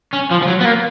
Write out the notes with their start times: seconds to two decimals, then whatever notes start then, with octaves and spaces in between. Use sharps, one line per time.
0.13 C#4
0.31 F3
0.43 F3
0.48 F#3
0.61 B3
0.65 A#3